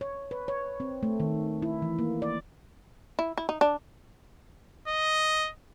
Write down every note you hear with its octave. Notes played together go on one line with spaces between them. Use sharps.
C#5
B4
C#5
C4
A3
D#3
E4
E3
A#3
D5
E4
E4
D#4
D4
D#5